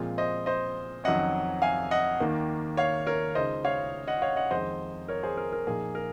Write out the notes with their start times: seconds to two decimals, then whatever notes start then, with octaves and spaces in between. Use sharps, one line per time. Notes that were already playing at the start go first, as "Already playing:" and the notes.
Already playing: A#2 F3 G#3 C4 F4
0.18 C5 D#5
0.46 C5 D#5
1.04 F2 D#3 F#3 C#4 D#5 F#5
1.62 F5 G#5
1.91 D#5 F#5
2.20 D#2 D#3 A#3
2.77 C#5 F5
3.07 A#4 C#5
3.35 C#2 C#3 G#3 D#4 C5 D#5
3.65 C#5 F5
4.08 D#5 F#5
4.22 C#5 F5
4.36 D#5 F#5
4.51 F2 D#3 G#3 D#4 C5 D#5
5.08 A#4 C#5
5.23 G#4 C5
5.37 A#4
5.52 A#4
5.67 A#2 F3 A#3 D#4 G#4
5.95 A#4